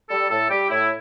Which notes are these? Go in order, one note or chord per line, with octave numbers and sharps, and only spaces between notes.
G3 A4
A2 A4
G3 G4
A2 E4